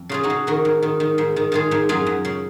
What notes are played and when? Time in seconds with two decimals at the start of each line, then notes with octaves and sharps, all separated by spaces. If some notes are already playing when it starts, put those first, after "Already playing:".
Already playing: F2
0.09 C#3 F4 G#4
0.23 D#4 F#4
0.30 C#3
0.47 D#3 F#4 A#4
0.65 G#2
0.82 D#3
1.00 D#3
1.18 G#2
1.36 D#3
1.52 D#3 F4 G#4
1.71 G#2
1.89 F#2 F4 G#4
2.06 F#2
2.25 C#3